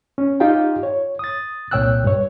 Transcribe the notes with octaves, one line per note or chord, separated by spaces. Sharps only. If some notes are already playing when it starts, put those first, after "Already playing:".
C#4
D#4 F4 G4 F5 G5
C#5
D#6 A6
C2 A#2 C#5 G5 E6 F#6
G2 C#5